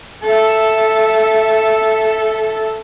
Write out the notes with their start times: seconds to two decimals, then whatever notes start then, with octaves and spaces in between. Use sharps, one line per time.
0.23 A4 E5